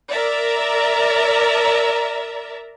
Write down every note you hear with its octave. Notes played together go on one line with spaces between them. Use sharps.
A#4 D5 E5 A#5